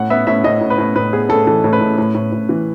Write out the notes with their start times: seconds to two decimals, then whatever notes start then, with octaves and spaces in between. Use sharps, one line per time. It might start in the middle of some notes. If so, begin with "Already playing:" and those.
Already playing: A2 F#5
0.10 B3 E5
0.27 A2 E5
0.44 A2 D#5
0.61 A2
0.70 B4
0.78 A2
0.96 A2 B4
1.13 B3 G#4
1.29 A2 A4
1.47 E3 A4
1.64 A2
1.73 B4
1.81 A2
1.98 A2
2.15 A2
2.32 A2
2.49 E3